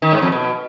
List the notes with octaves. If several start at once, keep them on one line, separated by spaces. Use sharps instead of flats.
D#3
G#2
F2
B2